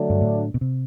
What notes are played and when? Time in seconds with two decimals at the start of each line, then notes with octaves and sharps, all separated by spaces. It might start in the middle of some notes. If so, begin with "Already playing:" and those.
Already playing: D3 F#3 A3 D4
0.10 G2
0.21 A2
0.54 B2
0.61 C3